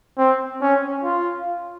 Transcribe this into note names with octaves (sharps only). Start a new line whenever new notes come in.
C4
C#4
F4